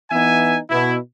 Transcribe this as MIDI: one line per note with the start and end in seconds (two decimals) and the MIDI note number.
0.11 0.57 52
0.11 0.57 59
0.11 0.57 63
0.11 0.57 76
0.11 0.57 80
0.70 0.97 47
0.70 0.97 64